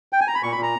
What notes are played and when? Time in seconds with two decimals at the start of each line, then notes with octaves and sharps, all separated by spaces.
0.13 G5
0.21 G#5
0.28 A#5
0.35 B5
0.43 A#2 C#6
0.52 B5
0.57 A#2
0.63 A#5